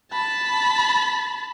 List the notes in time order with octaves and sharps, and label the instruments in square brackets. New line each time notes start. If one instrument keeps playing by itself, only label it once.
[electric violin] A5 B5